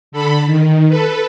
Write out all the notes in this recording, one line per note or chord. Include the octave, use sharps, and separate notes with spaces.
D3 A4 B5
D#3
A4 B4